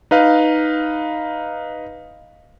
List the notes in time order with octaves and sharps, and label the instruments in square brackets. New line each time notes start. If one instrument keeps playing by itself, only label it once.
[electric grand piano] D#4 B4 F5